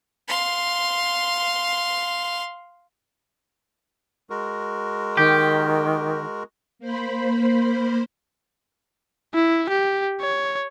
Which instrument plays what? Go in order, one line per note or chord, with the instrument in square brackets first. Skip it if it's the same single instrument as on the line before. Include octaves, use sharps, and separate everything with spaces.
[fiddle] F5 C6
[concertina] G#3 F#4 A#4
[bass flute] D#3 [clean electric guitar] G4
[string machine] A#3 C5 B5
[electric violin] E4
G4
C#5